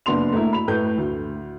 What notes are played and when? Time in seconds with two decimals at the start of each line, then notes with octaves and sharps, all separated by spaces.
0.06 F#1 B3 D4 C6 F7
0.33 A3 A#3 E4
0.53 B5 F7
0.68 A2 A3 B4 G6
0.98 D2